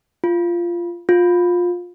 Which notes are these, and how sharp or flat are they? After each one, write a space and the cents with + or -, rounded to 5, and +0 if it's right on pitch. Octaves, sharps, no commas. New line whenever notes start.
F4 -15
F4 +20